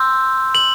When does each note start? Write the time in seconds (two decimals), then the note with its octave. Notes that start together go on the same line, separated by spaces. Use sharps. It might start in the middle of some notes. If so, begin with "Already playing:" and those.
Already playing: C6 E6 G6
0.55 F#7